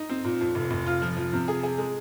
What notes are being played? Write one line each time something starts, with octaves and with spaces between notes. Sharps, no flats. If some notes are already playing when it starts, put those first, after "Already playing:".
Already playing: D#4
C4
A#2
F2
F1
F1
F4
F3
F3
C3
G#4
G#4
G#3